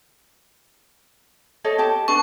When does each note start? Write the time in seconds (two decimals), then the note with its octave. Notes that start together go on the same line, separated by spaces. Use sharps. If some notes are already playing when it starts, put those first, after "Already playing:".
1.64 A4 C#5 D#5
1.78 G4 A5
2.08 D4 B4 A5 C#6